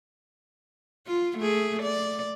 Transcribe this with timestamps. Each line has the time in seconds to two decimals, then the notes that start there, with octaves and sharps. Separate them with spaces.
1.07 F4
1.38 A3 G#4
1.82 D5